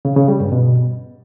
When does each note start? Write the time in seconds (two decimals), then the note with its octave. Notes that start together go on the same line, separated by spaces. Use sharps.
0.05 C#3
0.17 C#3
0.28 G3
0.40 G2
0.52 B2